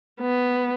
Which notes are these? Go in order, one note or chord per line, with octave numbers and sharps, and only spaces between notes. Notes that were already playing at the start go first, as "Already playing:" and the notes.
B3